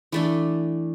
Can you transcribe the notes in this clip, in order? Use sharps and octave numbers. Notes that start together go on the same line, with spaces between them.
E3 A3 D4